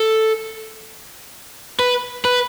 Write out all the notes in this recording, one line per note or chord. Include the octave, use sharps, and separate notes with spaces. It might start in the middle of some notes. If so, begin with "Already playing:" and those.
Already playing: A4
B4
B4